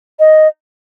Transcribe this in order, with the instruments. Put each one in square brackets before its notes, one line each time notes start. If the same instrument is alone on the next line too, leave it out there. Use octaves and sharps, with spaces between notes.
[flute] D#5